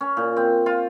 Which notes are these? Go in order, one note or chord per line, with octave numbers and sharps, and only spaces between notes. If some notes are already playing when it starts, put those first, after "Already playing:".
C#4
A#2
C4
F4